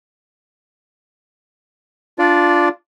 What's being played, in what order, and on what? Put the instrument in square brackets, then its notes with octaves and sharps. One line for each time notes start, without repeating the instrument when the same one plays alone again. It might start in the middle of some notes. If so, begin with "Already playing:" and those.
[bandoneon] D4 F4 D5